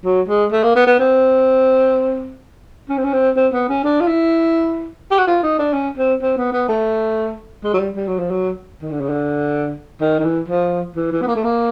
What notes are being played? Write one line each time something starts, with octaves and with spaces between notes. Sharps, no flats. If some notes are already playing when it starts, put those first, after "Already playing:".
F#3
G#3
A3
A#3
B3
B3
C4
C#4
C4
C#4
C4
C4
B3
C#4
D4
F4
E4
G4
F#4
F4
D#4
D4
C#4
C4
C4
B3
B3
A3
G#3
F#3
G3
G3
F#3
F3
F#3
D#3
D3
C#3
D3
D#3
D#3
E3
F3
E3
E3
B3
A#3
A3
A#3